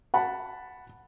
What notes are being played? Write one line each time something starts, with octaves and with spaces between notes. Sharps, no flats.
F#5 A5 B5